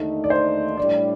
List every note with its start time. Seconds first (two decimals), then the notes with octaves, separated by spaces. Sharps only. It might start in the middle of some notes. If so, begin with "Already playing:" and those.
Already playing: D#2 D3 A3 D#4
0.24 D5
0.30 C5
0.77 A2 G3 D4 D5